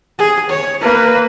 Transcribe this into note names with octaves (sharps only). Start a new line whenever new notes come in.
G#4
C#5
A#3 B4